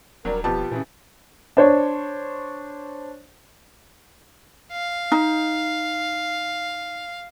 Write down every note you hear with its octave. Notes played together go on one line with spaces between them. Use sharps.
D#1 F#3 G3 D4 A#4
F2 B2 B3 F4 G4 A5
A#2 C#3 E3
D4 C5 C#5
F5
D#4